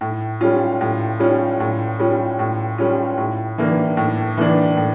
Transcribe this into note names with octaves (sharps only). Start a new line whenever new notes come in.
A2
G3 C#4 F4
A2
G3 C#4 F4
A2
G3 C#4 F4
A2
G3 C#4 F4
A2
E3 A#3 D4
A2
E3 A#3 D4
A2